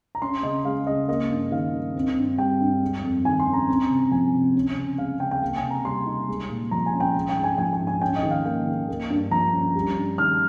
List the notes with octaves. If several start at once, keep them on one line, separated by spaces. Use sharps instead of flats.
A#5
C#4 C6
C#3 D#5
G#3 F5
C#3 D#5
A#3 D#5
G2
D#3 F5
D#4
C4
G2
G3 G5
G2
G#3
F2
D#3 G#5
C6
C#4
A#5
C4
C3
F3 G#5
C3
C#4
C#3
G#3 F5
C#3 G5
G5
A#3 F5
G#5
C3
A#5
G3 C6
D#4
G#3
A#2
F3 A#5
G#5
C#4
G5
G#3
G5
G#2
G#5
F3 G#5
G#5
G#2
G#5
C#4 G5
D#5
D#3
F5
A#3 G5
D#3
A#3
G2
F3 A#5
C#4
G3
G2
D#3 F6